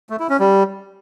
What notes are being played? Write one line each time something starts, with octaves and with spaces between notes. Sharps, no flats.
A3
E4
C#4
G3